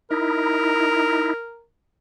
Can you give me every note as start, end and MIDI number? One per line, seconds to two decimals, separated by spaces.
0.11 1.33 63
0.11 1.33 64
0.11 1.64 70